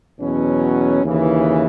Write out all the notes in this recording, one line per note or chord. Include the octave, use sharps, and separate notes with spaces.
E2 B2 F#3 C#4
D#2 C#3 E3